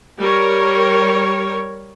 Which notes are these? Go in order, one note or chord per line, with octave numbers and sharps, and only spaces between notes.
G3 A#4 C#5